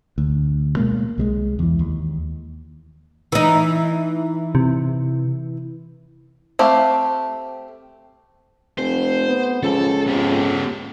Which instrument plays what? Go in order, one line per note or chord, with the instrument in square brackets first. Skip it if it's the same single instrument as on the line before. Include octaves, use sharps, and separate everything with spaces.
[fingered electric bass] D2
B2 G#3 A#3
C2 G3 G#3
E2 E3
D#2
[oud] E3 D#4
[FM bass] C3
[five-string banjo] A3 C4 G4 F5
[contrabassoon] F1 [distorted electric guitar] C5
[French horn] B3
[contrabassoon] C#2 [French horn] F3 [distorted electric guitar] A4
[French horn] F2 [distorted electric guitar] B3 G4